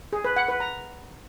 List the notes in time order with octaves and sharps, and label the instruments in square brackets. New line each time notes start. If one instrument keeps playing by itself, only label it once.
[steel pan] G#4
B4
F#5
B4
A#5